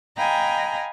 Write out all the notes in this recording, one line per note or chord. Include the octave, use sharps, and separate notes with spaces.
D#5 F5 G5 G#5 A#5 B5